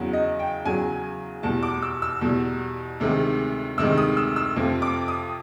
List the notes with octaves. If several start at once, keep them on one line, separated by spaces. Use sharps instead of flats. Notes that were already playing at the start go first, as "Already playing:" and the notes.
Already playing: E2 C#3 F#3
D#5
G5
E2 C#3 F#3 G#5
E2 B2 G3 A5
D6
E6
E6
E2 B2 G3
D2 C3 D#3 G#3
D2 C3 D#3 G#3 E6
D#6
E6
E6
F2 C3 F3
D6
D#6